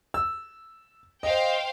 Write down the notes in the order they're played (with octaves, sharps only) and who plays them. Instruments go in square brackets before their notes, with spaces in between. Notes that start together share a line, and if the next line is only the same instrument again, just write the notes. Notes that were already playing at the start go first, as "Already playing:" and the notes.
[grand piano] E6
[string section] C5 F5 G5 [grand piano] D#5